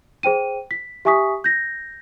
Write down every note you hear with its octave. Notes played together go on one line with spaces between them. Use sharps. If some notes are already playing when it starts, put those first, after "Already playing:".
G#4 C5 G5 D#7
B6
G4 E5 G#5 C#6 D#6 B6
G6 A#6